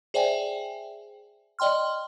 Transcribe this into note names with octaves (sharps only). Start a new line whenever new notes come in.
G#4 C5 D5 E5 G5 G#5
D5 D#5 G5 C6 F6